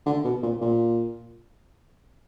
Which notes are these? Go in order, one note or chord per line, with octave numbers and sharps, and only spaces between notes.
D3
B2
A#2
A#2